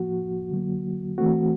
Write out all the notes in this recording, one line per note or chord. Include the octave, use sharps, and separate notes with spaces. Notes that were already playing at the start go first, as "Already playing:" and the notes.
Already playing: A2 F3 A#3 F#4
D3 F#3 A#3
E3 A3 C4 F#4